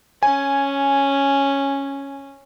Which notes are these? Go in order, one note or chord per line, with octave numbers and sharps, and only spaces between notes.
C#4 G#5